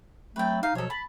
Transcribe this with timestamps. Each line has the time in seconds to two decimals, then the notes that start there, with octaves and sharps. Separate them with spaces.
0.36 F#3 A3 C4 B4 G5
0.63 D#4 F5
0.75 B2 F3 F#3 A4 C#5
0.90 A5 B5